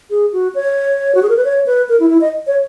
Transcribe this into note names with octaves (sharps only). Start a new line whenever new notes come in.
G#4
F#4
C#5
F#4
G#4
A#4
B4
C#5
B4
A#4
E4
E4
D#5
C#5